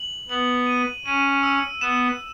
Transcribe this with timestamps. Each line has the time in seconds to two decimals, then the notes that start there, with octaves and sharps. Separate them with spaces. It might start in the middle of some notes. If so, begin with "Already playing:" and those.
Already playing: F#7
0.29 B3 F#7
0.67 D#7
1.06 C#4 D#7
1.43 E6
1.81 B3 E7